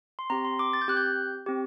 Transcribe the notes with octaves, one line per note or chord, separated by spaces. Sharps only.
C6
C4 G4 A#5
C6
D6
A6
G6
C4 G4 F#6
G6
C4 G4